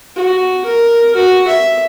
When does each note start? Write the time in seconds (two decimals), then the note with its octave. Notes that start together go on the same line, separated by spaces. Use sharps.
0.16 F#4
0.65 A#4
1.16 F#4
1.47 E5